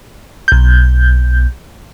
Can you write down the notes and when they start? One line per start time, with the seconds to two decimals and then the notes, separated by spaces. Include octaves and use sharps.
0.48 B1 G6